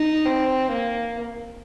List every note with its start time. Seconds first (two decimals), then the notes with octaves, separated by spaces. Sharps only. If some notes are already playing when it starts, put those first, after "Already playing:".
Already playing: D#4
0.26 C4
0.70 A#3